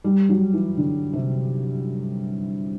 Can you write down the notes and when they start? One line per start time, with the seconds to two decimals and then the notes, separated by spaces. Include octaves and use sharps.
0.04 G3
0.29 F#3
0.53 E3
0.77 D3
1.13 C3